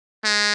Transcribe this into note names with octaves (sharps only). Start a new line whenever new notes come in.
G#3